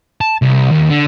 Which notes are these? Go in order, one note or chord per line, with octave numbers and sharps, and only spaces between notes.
A5
C2
D#2
D3